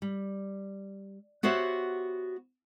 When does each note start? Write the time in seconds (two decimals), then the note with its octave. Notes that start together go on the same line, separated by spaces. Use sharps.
0.02 G3
1.43 B3 F#4 G4 C5 C#5 E5